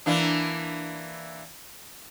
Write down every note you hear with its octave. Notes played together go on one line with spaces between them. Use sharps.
E3 A#3 D4